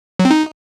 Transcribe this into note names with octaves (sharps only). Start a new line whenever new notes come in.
F#3
C4
D#4